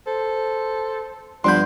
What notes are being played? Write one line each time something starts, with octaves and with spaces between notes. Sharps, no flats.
A4 C5
G2 F3 B3 D4 B5 C6 G6